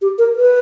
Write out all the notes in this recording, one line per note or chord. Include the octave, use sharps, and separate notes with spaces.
G4
A#4
B4